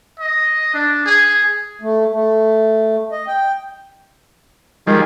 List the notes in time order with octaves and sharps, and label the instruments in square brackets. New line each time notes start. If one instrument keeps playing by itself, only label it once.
[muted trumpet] D#5
D4
G#4
[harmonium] A3
A3
D#5
G5
[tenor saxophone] D#3 [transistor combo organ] F3 G3 G#3